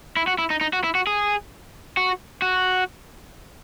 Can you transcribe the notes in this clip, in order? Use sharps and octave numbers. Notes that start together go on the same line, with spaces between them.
E4
F#4
E4
D#4
D#4
F#4
E4
F#4
G#4
F#4
F#4